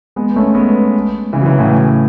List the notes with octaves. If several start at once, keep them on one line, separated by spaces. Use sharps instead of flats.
G#3 B3
A3 C#4
G#3 B3
C#3 E3
F#3
C#3 E3
A2 C#3